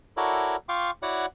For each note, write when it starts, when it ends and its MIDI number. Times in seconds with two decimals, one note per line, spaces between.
0.17 0.56 64
0.17 0.56 66
0.17 0.56 69
0.17 0.56 70
0.17 0.56 73
0.17 0.56 74
0.69 0.91 65
0.69 0.91 77
0.69 0.91 79
0.69 0.91 85
0.69 0.91 86
1.02 1.26 64
1.02 1.26 66
1.02 1.26 73
1.02 1.26 74
1.02 1.26 78